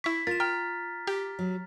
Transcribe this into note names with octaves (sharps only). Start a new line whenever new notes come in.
E4 C#6 B6
F4 A#4 A6 E7
G5 A#5 F6
G4
F#3